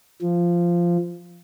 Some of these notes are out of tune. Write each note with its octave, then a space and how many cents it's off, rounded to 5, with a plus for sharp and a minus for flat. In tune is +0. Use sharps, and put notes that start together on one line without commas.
F3 -10